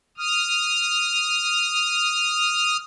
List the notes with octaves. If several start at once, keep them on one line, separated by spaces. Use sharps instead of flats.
D#6 F6